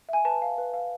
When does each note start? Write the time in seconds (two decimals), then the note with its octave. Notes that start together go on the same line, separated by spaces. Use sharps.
0.09 E5 G#5
0.25 B4 A5
0.42 F5
0.58 B4
0.74 F5